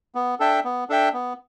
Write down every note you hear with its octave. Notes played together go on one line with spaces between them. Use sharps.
B3
D4 A4 E5 G5
B3
D4 A4 E5 G5
B3